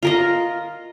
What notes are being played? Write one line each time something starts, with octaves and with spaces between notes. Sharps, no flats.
F4 A#4 D#5